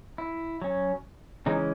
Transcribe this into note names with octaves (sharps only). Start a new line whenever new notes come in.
E4
F#3 C#4
C#3 E3 G#3 C#4 D#4